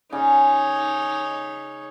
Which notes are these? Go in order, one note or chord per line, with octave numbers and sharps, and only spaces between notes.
C#3 D#4 C#5